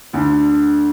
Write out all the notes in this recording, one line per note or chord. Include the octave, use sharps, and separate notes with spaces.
D2 D3